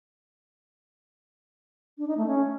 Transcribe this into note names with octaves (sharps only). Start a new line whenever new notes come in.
D4
D#4
A3
C#4